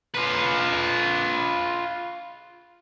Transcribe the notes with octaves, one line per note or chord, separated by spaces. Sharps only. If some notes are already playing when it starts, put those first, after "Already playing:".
F4 B4